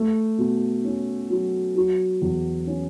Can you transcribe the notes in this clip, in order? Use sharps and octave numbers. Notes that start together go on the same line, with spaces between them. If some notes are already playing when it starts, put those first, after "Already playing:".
Already playing: A3
B2
C#4
F#3
F#3
E2
C#4